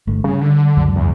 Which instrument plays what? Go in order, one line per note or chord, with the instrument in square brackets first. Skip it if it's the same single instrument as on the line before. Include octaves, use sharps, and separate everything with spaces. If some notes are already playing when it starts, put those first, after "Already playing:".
[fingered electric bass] G1 A3
[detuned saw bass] C#3 [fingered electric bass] G3
[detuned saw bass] D3
[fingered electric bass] C#2 F#2 F#3
[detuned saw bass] E2